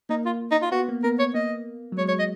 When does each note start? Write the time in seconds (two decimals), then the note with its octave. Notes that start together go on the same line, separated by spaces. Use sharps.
0.09 A#3 D#4
0.26 F4
0.51 D#4
0.62 F4
0.72 B3 F#4
0.88 A#3
1.04 B3 A#4
1.19 C#5
1.34 A#3 D#5
1.92 F#3
1.98 G#3 C#5
2.08 C#5
2.19 D#5